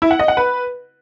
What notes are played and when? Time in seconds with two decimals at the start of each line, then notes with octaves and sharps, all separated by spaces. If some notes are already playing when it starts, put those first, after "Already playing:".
0.02 E4
0.11 F#5
0.19 D#5
0.28 F#5
0.37 B4